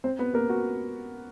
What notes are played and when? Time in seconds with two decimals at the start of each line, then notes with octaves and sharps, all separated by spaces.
0.04 C4 C5
0.19 B3 B4
0.34 A#3 A#4
0.50 F#4